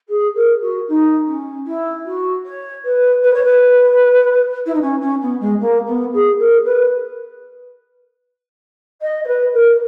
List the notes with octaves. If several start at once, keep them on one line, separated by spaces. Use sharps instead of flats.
G#4
A#4
F#4
D#4
C#4
E4
F#4
C#5
B4
B4
C#5
B4
E4
D#4
C#4
C#4
B3
G#3
A#3
B3
G#4
A#4
B4
D#5
C#5
B4
A#4